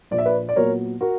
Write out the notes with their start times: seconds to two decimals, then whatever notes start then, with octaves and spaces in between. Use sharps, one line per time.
0.11 A#1 D5
0.18 E5
0.26 B4 D5
0.49 D5
0.56 A#2 F#3 B3 A#4 C#5
1.01 F#4 A#4